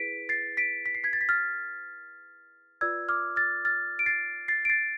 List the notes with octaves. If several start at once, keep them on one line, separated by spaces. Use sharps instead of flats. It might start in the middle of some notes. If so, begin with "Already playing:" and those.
Already playing: E4 G#4 B4 B6 D7
A6 C7
B6 D7
B6
C7
G#6 B6
A6
B6
F6 A6
F4 B4 D5 E6 G#6
D6 F6
F6 A6
F6 A6
D7
A6 C7
A6 C7
D7
A6 C7